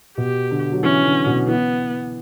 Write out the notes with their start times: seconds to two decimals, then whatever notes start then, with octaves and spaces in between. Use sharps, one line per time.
0.18 B2 G4
0.51 D3
0.72 F#3
0.83 E3 C#4
1.04 D3
1.26 B2
1.48 E3 B3